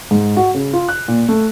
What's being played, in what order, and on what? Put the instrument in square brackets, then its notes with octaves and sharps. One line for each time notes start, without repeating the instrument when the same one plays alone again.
[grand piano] G#2
F#4
C#3
F4
F#6
A#2
A3